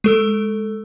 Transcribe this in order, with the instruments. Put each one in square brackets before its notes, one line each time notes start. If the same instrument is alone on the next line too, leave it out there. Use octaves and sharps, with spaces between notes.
[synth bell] G#3 A4 E6